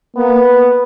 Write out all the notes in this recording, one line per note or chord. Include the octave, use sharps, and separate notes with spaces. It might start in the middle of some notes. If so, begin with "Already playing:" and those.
A#3 B3